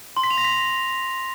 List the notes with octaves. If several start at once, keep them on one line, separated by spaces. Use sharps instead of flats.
C6
B6
F7
A#6
B6